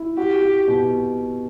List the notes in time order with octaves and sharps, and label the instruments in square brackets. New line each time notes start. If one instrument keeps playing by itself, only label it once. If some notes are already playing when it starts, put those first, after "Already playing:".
Already playing: [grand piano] E4
[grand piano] F#4 [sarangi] G4
[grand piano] F#4
B2